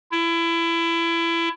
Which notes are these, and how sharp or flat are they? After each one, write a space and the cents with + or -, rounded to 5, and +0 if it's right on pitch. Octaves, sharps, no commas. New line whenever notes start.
E4 +25